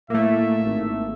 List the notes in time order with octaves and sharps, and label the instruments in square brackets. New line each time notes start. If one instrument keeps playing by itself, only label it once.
[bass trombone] A2 [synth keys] A3 A#3 [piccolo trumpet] E5
[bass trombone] G#1